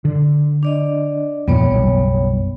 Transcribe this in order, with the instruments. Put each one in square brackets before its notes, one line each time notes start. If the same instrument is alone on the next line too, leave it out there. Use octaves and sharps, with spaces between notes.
[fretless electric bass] D3
[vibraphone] D4 D5 D#5
[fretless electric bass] E2 A#2 F3 [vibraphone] G3 B3 C#5
[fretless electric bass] F#1 B1